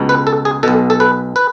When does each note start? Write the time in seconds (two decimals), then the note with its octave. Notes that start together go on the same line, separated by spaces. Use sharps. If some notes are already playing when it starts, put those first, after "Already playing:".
Already playing: C#2 B2
0.09 B4
0.27 A4
0.45 G#4
0.63 B1 B2 A4
0.90 A4
1.00 B4
1.36 B4